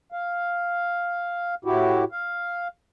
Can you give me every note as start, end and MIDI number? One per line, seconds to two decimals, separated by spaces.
0.12 1.55 77
1.65 2.04 45
1.65 2.04 64
1.65 2.04 66
1.65 2.04 67
2.12 2.68 77